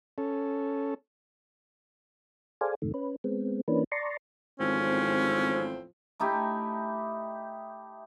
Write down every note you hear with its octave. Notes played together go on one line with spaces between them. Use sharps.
C#4 A4
G#4 A4 C5 D5 F5 G#5
F2 G#2 C3 D#3 A3
C#4 B4
G#3 B3 C4
E3 A#3 C#4 D4 B4
D5 A5 A#5 C6 C#6
G#1 E2 A2 F3 C4 C#4
A3 D#4 E4 G4